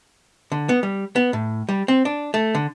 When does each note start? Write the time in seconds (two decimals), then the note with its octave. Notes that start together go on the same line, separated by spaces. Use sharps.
0.52 D3
0.69 B3
0.83 G3
1.16 B3
1.33 A2
1.69 G3
1.88 C4
2.05 D4
2.34 A3
2.55 D3